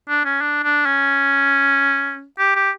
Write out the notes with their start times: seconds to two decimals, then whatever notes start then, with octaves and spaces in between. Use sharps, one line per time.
0.09 D4
0.25 C#4
0.41 D4
0.63 D4
0.86 C#4
2.38 G4
2.56 G4